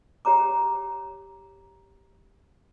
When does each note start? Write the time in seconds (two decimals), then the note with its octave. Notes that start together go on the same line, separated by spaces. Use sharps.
0.25 G4 C#5 A#5 D6